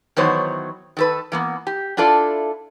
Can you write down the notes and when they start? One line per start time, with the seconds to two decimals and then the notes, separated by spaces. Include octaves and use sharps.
0.17 D#3 E3 F#3 B3 C5 C#5
0.97 D#3 A4 B4
1.32 E3 A#3 B3
1.67 G4
1.97 D4 E4 F4 A4 D5